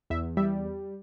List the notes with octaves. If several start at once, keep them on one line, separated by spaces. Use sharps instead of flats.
E2 E5
G3 E5